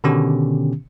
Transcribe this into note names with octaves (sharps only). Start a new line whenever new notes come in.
B2 D3 D#3 B3 C#4 G4